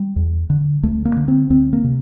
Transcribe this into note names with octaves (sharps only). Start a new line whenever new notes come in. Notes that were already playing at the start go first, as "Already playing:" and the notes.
Already playing: G3
E2
D3
D2 A3
A#3
D3
C4
D2 C4
A#3
C3